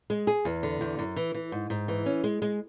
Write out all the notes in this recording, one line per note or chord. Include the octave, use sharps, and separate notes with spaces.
G#3
G#4
E2
D3
E2
F#2
E3
E3
G#2
G#2
E3
C#4
G#3
G#3